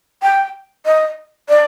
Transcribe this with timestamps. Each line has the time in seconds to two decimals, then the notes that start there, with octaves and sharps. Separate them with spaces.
0.23 G5
0.86 D#5
1.49 D5